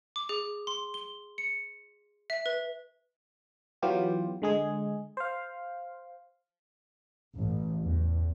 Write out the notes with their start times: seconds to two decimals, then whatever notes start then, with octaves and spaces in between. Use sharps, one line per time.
0.16 D6
0.29 G#4
0.67 C6
0.94 G7
1.38 C#7
2.30 E5
2.46 B4
3.82 E3 F#3 B3 F4 G4
4.42 D3 G#3 G#4
5.17 C5 F5
7.35 A1
7.84 E2